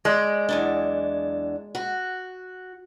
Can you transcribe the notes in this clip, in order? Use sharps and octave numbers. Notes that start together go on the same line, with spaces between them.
G#3 D5
E2 F#3 D4
F#4